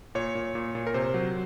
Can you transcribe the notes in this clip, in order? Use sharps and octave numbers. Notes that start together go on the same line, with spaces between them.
A#2 C#5
A#2
A#2
A#2
A#4
C3 C5
F#3